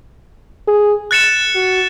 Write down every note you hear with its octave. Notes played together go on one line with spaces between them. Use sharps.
G#4
F#6 A6 C#7 E7
F#4